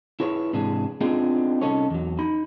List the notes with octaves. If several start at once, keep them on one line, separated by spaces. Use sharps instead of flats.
E4 G#4 B4 C#5
G#2 C3 E3 D4 G#4
B3 C4 D4 D#4 F4 G#4
C2 C#4 D#4 A4 C#5
E2 F#3
D#4 B5